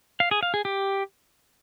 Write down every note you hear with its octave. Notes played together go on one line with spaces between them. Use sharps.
F5
G#4
F5
G#4
G4